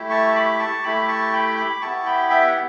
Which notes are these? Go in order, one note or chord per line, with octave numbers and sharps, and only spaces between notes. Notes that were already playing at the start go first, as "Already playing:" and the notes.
Already playing: A3 E4 G4
A5 C#6
B5 D6
A5 C#6
A3 E4 G4 B5 D6
A5 C#6
G5 B5
B5 D6
B3 E4 G4 A5 C#6
G5 B5
E5 G5
F#5